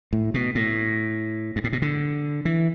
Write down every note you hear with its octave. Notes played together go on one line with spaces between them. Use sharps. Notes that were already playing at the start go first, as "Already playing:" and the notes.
A2
B2
A2
G2
A2
B2
D3
E3